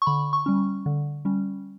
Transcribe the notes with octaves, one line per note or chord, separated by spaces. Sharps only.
C#6
D3 B5
C#6
G3 C#4
D3
G3 C#4